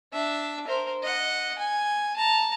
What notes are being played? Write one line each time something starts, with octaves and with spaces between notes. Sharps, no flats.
D4 E5
A#4 C5
D#5 F#5
G#5
A5 A#5